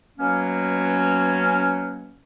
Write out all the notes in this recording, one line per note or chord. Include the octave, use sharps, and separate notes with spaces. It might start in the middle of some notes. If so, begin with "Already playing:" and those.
B2 F#3 A#3 C#4